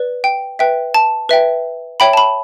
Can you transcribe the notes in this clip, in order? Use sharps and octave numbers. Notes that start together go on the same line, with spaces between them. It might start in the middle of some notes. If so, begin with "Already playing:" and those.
Already playing: B4 D5
G5
B4 E5 G5
A5
B4 E5 G5
C#5 E5 G5 B5
A5
B5